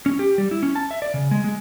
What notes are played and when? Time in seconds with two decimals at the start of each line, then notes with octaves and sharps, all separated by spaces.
0.06 C#4
0.19 G4
0.38 G3
0.51 E4
0.63 C#4
0.76 A5
0.91 E5
1.02 D5
1.14 C#3
1.31 G#3
1.44 G#3